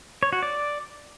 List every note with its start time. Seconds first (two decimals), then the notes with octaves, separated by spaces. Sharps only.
0.23 C#5
0.33 F#4
0.43 D5